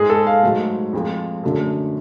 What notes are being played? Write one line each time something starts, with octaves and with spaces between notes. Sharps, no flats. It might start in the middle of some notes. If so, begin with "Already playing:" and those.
Already playing: G#2 G#3 G#4
A4
F5
G#2 F#3 A3
F2 F3 G#3
F#2 D3 F#3 A3